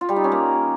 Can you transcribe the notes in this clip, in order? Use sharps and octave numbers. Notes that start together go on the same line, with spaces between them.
F4
G3
D#4
C#4
A#3